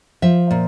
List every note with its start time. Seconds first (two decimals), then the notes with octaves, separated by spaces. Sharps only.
0.22 F3 E5
0.51 A#2